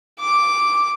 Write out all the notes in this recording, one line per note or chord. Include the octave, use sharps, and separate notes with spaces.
D6